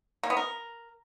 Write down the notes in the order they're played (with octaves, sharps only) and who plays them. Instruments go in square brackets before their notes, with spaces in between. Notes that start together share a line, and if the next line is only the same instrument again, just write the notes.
[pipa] A#3
B3
A#4